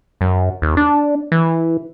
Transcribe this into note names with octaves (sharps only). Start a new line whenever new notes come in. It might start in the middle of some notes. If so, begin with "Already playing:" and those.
F#2
D#2
D4
E3